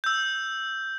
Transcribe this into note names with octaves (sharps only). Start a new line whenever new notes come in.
E6 G6